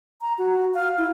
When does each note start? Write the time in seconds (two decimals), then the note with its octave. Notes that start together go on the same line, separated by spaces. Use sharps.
0.21 A#5
0.38 F#4
0.74 F5
0.98 E4